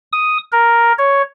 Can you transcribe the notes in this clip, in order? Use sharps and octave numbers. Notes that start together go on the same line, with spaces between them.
D#6
A#4
C#5